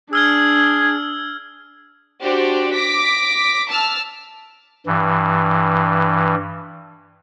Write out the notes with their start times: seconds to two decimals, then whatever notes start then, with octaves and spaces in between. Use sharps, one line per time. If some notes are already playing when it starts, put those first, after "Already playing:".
0.13 D4 G#4 E6 F6 G#6
2.22 D4 F#4 G4 C5 D5
2.74 D6 A#6 B6
3.69 A5 E6 F6
4.86 G2 E3